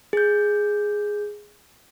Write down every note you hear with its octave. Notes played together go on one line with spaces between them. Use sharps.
G#4 G6